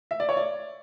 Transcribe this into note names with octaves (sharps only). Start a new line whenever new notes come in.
E5
D5
C#5
D5